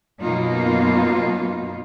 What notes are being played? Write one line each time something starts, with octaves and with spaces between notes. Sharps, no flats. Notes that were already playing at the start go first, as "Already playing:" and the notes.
F#2 B2 F#3 A#3 D#4 F4